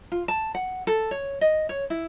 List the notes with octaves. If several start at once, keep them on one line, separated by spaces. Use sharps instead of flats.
F4
A5
F#5
A4
C#5
D#5
C#5
E4